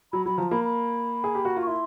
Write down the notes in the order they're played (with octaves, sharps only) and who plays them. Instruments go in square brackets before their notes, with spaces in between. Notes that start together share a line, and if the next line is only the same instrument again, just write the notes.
[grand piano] F#3 [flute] B5
[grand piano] F#3 [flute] B5
[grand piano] F3 [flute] A#5
[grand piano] A#3 [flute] B5
[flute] B5
[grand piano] G#4
G4
F#4
F4
[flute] C#6
[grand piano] E4 [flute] C6